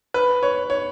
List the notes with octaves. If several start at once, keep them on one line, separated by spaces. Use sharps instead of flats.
B4
C#5
C#5